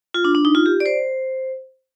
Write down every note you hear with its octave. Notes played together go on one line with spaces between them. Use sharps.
F4
D4
D4
D#4
F4
G4
D5
C5